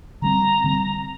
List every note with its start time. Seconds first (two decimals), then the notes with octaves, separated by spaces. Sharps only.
0.22 D3 G3 C4 A#5
0.64 D3 G3 C4